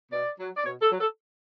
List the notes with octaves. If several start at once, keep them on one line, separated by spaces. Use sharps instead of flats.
B2 D5
F#3
D5
B2 C#5
A4
F#3
A4